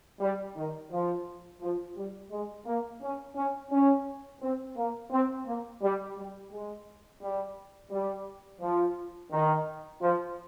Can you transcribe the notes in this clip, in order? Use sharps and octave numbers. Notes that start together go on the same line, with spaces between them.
G3
D#3
F3
F3
G3
G#3
A#3
C#4
C#4
C#4
C4
A#3
C4
A#3
G3
G3
G#3
G3
G3
F3
D#3
F3